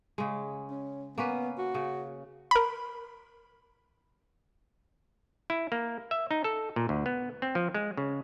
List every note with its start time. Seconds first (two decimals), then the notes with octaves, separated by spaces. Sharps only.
0.18 C#3 G#3
0.70 C#4
1.18 A#3 B3 C#4 B4
1.58 F#4
1.74 C#3
2.51 A#4 B5
5.50 E4
5.72 A#3
6.11 E5
6.31 D#4
6.44 A4
6.76 A#2
6.89 D2
7.06 B3
7.42 C4
7.55 F3
7.74 G#3
7.97 C#3